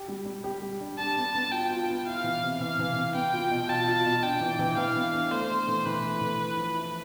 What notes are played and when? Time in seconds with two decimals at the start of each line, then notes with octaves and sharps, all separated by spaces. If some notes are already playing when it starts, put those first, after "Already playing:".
Already playing: G4
0.08 G3
0.25 G3
0.44 G4
0.62 G3
0.81 D4
0.98 D4 A5
1.17 B3
1.35 B3
1.52 F4 G5
1.70 F4
1.89 B3
2.06 E4 F5
2.24 E3
2.42 C3
2.60 E3 F5
2.79 E3
2.96 B3
3.15 B3 G5
3.33 F4
3.51 B2
3.68 F4 A5
3.88 F4
4.06 B2
4.23 D4 G5
4.41 E3
4.59 E3
4.77 E3 F5
4.96 B3
5.13 D4
5.31 A3 C5
5.49 A3
5.68 E3
5.85 E3 B4
6.03 A3
6.21 E3
6.40 E4
6.57 F3
6.75 E4